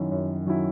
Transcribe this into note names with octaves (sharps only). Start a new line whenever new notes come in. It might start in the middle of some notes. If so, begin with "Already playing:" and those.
Already playing: F#2 D#3 F#3 C#4 E4
F#2
D#3 F#3 C#4 E4